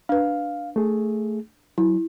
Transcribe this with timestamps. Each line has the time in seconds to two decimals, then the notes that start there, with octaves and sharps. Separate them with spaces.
0.09 D4 B4 F5
0.76 A3 G#4
1.78 F#3 E4